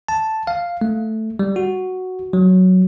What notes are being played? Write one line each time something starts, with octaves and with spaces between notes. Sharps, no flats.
A5
F5
A3
G3
F#4
F#3